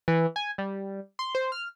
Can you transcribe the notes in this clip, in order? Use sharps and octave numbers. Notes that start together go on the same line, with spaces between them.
E3
G#5
G3
C6
C5
F6